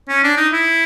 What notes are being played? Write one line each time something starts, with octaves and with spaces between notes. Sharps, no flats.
C#4
D4
D#4
E4